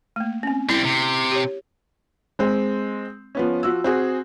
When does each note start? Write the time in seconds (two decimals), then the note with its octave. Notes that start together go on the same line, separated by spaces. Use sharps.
0.16 A3 A#3
0.43 C4 C#4
0.69 G3 C4 E4
0.85 C3
1.32 G4 C#5
2.39 G#3 C4
3.35 F3 B3 C#4
3.63 F3 F#4 E6
3.84 C4 F#4 G#4